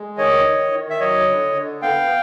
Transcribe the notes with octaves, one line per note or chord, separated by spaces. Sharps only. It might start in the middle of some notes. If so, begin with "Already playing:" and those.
Already playing: G#3
D#3 C#5 D#5
D#3
D#3
E5
F#3 C#5 D#5
D3
D3
B3 F5 G5